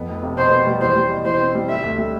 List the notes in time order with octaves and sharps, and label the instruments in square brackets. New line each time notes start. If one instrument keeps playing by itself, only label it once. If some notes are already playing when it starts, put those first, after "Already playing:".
Already playing: [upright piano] F2 B3
F1
C3
[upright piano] B2 [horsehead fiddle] C5
[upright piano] B3
G3
[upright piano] E2 [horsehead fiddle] C5
[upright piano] G3
B2
[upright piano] E3 [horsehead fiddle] C5
[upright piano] C4
G3
[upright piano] D3 [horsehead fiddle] E5
[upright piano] D2
G3